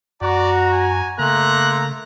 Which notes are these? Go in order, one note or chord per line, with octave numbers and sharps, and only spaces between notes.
F#2 F#4 D5 A#5
G#5
C#3 A3 A#3 A#5 C6 F#6